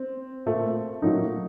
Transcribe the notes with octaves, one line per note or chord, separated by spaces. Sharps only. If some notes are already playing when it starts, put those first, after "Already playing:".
Already playing: C4
A#2 A3
A#2 F#3 A3 D#4